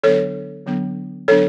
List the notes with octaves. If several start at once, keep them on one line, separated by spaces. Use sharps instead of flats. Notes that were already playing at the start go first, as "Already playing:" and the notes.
D3 F#3 B3 D4 A4 C#5
D3 F#3 B3 D4
D3 F#3 B3 D4 A4 C#5